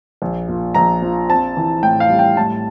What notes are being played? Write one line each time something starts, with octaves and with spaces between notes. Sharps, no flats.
A#1
A#2
A#1 A#5
F3
C4 A5
E3
A2 G5
F5
G3
G5
A2 A5